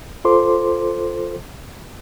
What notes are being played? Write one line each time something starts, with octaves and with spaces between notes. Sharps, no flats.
F4 A4 C5 C6 D6